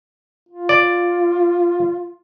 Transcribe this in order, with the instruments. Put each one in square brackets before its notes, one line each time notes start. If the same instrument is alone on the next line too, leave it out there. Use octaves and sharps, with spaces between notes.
[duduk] F4
[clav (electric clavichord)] D5